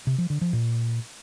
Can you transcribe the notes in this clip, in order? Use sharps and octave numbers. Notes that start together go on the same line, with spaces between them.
C3
F3
D3
F3
A#2